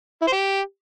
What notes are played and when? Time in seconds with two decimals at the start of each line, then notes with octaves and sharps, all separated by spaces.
0.22 E4
0.27 C5
0.32 G4